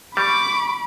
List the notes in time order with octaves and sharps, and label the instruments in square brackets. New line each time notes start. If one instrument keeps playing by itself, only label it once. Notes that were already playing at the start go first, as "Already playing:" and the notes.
[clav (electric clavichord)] G3 [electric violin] B5 [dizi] C#6 [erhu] D6